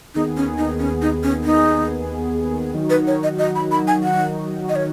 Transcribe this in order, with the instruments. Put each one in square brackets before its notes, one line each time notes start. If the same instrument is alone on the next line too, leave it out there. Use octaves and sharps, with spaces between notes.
[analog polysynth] D#2 D#3 B3 G#4 [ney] D#4
[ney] C#4
D#4
C#4
D#4
C#4
D#4
[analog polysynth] D#3 F#3 D#4 F#4
[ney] B4
C#5
D#5
D#5
B5
B5
G#5
F#5
D#5
C#5